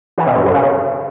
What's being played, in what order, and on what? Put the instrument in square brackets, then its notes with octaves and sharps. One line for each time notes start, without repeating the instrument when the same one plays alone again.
[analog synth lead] E3
B2
G2
F#2
C#3